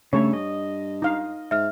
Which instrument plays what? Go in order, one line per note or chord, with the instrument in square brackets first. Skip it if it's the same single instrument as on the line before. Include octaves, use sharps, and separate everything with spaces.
[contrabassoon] G2 [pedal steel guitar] C#3 A3 A4 [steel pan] C#5
[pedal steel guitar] D#5
[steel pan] D#4 F5
[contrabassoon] G#2 [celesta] E5 F6